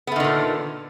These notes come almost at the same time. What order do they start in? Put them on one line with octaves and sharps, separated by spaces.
B3 A3 D#3 D3 A#2